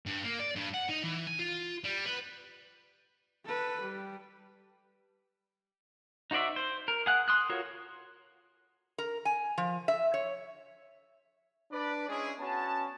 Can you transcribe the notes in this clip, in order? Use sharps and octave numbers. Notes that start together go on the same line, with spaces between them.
G2
A#3
D5
G2
F#5
D#4
E3
G#5
F4
G3
B3
A4 B4
G3
D#4 F#4 C5 D5 E5
C5
A#4
G#4 F#5 F#6
C6 D#6 F#6
F4 F#4 A4 A#4 C#5
A#4
G#5
F3
E5
C#5
D4 B4 D5
G#3 C#4 D4 E4 G#4
B3 C#4 F#4 A5